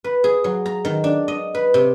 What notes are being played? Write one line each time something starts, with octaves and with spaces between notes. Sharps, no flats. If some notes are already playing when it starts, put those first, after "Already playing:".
B4
G#4
F#3
A#5
D#3
D4
D#5
B4
C3